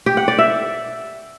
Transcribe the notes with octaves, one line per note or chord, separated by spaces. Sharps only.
G4
F#5
D5
E5